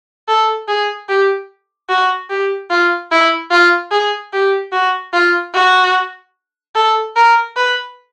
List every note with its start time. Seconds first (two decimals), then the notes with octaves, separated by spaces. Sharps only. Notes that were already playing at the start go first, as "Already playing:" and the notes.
0.28 A4
0.68 G#4
1.09 G4
1.89 F#4
2.30 G4
2.70 F4
3.11 E4
3.51 F4
3.91 G#4
4.33 G4
4.72 F#4
5.13 F4
5.54 F#4
6.75 A4
7.16 A#4
7.57 B4